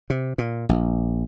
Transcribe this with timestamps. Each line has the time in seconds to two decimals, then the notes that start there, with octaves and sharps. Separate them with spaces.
0.10 C3
0.38 A#2
0.69 A#1